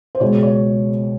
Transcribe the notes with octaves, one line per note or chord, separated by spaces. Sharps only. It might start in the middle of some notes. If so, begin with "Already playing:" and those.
C5
C#2 B2 G#3 C#5
C#5